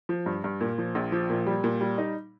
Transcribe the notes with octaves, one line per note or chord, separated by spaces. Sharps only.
F3
G2
G2
A#2
F3
A#1
F3
A#2
G3
A#2
G3
D#4